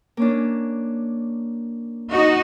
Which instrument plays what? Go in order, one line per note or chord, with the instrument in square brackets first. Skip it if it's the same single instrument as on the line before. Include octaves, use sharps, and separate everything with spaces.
[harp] A#3 C#4 D4
[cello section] D#4 F#4